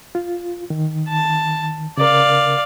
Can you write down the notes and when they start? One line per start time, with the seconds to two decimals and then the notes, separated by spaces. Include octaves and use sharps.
0.15 F4
0.70 D#3
1.09 A5
1.97 C#3 A#4 D5 F5